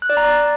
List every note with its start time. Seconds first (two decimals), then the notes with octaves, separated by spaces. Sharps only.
0.02 F#6
0.10 D5
0.17 A#5
0.24 D5